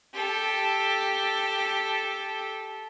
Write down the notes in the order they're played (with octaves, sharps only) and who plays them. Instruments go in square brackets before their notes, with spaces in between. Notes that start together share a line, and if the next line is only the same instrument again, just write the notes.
[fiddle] G4 A4